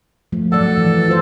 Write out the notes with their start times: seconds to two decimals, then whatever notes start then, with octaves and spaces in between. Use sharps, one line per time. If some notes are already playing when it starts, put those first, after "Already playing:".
0.32 F3 A3
0.52 F#3 A4 D5 F#5
0.78 E3
1.08 F4 C5